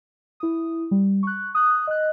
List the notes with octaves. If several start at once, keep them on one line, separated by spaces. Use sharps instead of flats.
E4 D#6
G3
C#6 F#6
D#6 F#6
D#5 F#6